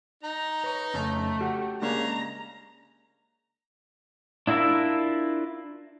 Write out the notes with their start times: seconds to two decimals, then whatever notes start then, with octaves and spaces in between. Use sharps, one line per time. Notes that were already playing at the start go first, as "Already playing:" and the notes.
0.23 D#4 A#5
0.64 B4 C#5
0.94 F2 C#3 A3 C#4 A5
1.41 F#4 G4
1.82 C#3 G#3 A#3 D4 A#5
4.47 D4 E4 F4 A#4 E5